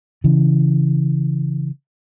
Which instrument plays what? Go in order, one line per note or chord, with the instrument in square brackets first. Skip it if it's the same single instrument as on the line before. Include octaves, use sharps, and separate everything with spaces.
[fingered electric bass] C#3 E3